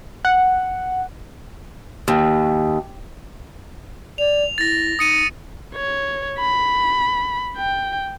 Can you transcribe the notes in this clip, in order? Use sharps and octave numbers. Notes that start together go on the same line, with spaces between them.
F#5
D#2
D5 F7
E4 A6 A#6
D#4 D#6 C#7 D#7
C#5
B5
G5